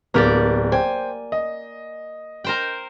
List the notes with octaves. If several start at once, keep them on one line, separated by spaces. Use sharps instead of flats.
D1 A#3 B3 G4 D5
C5 G5 G#5
D#5
A#4 C5 G5